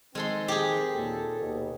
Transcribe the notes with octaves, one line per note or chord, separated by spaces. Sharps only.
D#3 G#3 C4 A4 C6
G4 G#4
D#2 A#2 A4
D#2 B2